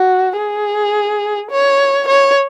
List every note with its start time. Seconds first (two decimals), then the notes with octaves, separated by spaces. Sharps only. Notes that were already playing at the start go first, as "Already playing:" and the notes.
Already playing: F#4
0.37 G#4
1.51 C#5
2.08 C#5